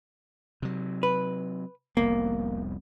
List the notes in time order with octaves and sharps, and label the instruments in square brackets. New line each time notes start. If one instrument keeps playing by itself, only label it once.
[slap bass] C3 F#3
[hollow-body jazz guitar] B4
[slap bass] F1 C2 B3 [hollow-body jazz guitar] A#3